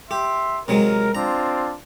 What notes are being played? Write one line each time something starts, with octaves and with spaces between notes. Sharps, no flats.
G4 E5 C6
C3 F#3 G#3 A#4
C4 D4 F4 A#5